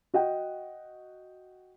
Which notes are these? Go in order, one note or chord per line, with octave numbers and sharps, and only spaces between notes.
F#4 D#5 F#5 G5